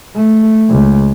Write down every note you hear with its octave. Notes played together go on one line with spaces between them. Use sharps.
A3
C#2